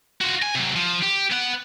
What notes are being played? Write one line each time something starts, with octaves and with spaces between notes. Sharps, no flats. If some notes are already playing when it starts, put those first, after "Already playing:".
F4 F#4
G#5
C3 F#3
F3
G4
B3 F#5